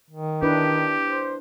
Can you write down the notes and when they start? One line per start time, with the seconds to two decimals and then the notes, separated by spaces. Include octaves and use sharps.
0.10 D#3
0.42 D4 E4 G4 B4
1.05 C5